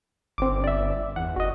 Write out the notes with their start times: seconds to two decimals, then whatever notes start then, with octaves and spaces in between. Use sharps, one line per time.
0.38 G1 C4 D6
0.64 D5 E5
1.16 E2 F#5
1.36 F#1 F#4 D#5